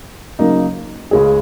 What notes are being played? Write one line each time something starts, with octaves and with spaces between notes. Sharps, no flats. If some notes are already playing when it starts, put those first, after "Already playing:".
C#3 F#3 A#3 D#4
C#2 C#3 G#3 C#4 G#4